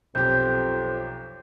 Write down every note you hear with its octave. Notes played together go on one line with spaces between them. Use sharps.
B1 F2 C4 G4 G6